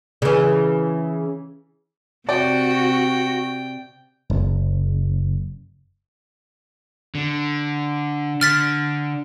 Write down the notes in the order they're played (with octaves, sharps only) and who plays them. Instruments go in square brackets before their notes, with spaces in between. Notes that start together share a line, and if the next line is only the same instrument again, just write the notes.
[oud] C#3 E3
[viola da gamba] C3 [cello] F#4 [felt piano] D5 [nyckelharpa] G5
[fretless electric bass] F#1
[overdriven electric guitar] D3
[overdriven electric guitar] D3 [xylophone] F6 A6 B6